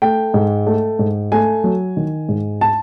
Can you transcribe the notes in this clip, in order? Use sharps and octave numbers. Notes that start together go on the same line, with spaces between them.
A3 G5
G#2
A3
G#2
A3 G#5
F#3
D#3
G#2
A5